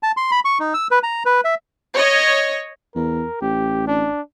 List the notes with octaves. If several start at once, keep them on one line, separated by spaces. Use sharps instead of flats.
A5
C6
B5
C#6
D#4
E6
B4
A#5
B4
E5
C#5 D#5
E2 A#4
A1 G4
D4